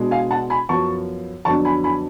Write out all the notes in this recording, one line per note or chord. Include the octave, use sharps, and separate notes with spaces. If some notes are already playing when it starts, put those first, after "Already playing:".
Already playing: B2 G#3 B3 D4
F5 G#5
F#5 A5
G#5 B5
F#2 F3 B3 A5 C#6
F2 D3 F#3 B3 D4 A5 C#6
G#5 B5
G#5 B5